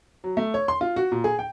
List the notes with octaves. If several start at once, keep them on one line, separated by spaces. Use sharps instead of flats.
F#3
A3
C#5
C6
F4
F#4
A#2
G#4
G5